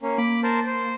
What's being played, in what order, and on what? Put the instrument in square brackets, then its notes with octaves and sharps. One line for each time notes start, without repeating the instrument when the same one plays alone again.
[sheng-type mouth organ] A#3 C#4
[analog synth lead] A#3 [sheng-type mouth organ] B5 D6
[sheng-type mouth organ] A#4 C5 A5
C5